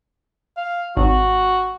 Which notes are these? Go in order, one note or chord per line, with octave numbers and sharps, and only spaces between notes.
F5
G#1 F#4